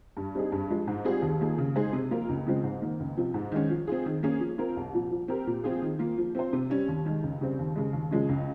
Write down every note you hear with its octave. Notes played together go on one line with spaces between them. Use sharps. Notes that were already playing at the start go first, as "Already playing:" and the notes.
G2
G3 C4 D#4 G#4
G2
F3 G#3
G#2
G3 C4 F4 G#4
D#2
D#3 A#3 F4 G#4
C#3
G#3 D#4 G#4 C5
C3
F3 A#3 F4 A#4
C#2
C#3 F3 G#3 C4
G#2
D#3 A#3
C#2
C3 F3
G#2
D#3 G#3 C#4
F3
C4 F4 G#4
D#3
A#3 C#4 G#4
F3
C4 F4 A#4
C2
A#2 F3
F3
C4 G4 A#4
A#2
F3 C4 F4 G#4
D#3
A#3 F4
F3
C4 F4 C5
C3
G3 C#4
D#2
D#3 G#3
C#2
C#3 G3 C4
D#2
C#3 G#3
D#2
C#3 F3 G#3 C#4
C#2